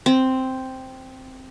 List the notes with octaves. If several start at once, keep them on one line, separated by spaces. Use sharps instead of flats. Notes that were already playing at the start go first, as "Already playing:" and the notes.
C4